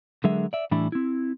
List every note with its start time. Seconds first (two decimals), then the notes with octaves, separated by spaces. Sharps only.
0.24 D3 F#3 G#3 G#4 A#4 E5
0.53 D5 E5
0.71 A2 E3 G3 D4 E4
0.92 C4 E4